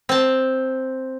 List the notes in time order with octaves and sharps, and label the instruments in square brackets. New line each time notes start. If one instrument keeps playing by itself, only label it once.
[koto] C4 A5